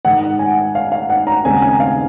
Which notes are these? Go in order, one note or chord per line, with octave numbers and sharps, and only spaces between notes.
G#2 D#3 G#3 F#5
G#5
F5
F5
F#5
A#5
D#2 C#3 G#3 C4 G#5
G#5
F5